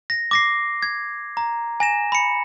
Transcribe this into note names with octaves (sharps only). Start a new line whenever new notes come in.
A#6
D6 A#6 C7
G#6
A#5
G#5 A#6 E7
B5 C#7